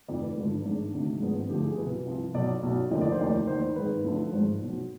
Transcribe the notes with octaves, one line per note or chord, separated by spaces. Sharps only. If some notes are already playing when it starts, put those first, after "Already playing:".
F1 F2 D#3 D5
B4
G#1 G2 D3 F3 B4
D4
G#1 G#2 D#3 D4
D2 C3 D#3
G#3
G#1 G#2 F3 B3
C4
D2 D3 F3 G4
G#4
C2 B2 B4
C2 C3 F3
B1 B2 D5
B1 B2
F1 D#2 D3 F3 D#5
D5
C5
F1 D#2 D#3 D5
D#2 D#3 C5
C5
G#1 G#2 D#3 B4
D2 D3 F3
G#1 G#2 F3 C5
B1 B2